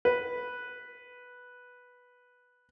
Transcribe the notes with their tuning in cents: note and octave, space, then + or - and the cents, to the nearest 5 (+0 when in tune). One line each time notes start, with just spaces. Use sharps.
B4 -5